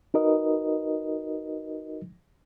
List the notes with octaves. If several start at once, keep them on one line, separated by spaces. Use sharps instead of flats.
D#4 F#4 A#4 B4 D#5